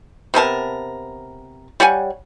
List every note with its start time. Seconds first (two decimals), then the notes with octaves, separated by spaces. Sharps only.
0.34 C3 B3 A#4 A5
1.80 G3 C#5 F#5 G#5